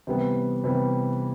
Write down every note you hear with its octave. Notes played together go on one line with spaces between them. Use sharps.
C3 E3 G3 B3
C3 E3 G3 B3